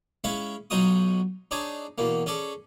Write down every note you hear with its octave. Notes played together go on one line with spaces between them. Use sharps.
G#3 C#4 E4 E5 F5
B1 F#3 D#4 F4 F#4 D#6
D4 D#4 G#4 C#5 A5
E2 B2 A#3
C#4 G#4 A4 D5